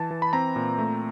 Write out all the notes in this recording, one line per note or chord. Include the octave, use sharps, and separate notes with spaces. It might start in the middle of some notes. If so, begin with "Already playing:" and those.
Already playing: E3 A5
E3
B5
C4 A#5
A#2
A3